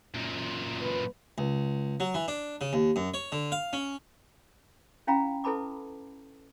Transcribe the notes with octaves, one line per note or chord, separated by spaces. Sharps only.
F#2 A#2
B4
C#2
F#3
E3
D4
C#3
D#2
F#2
C#5
D3
F5
C#4
C#4 E4 F5 G5 A#5 B5
E4 A4 B4 A5 B5 D6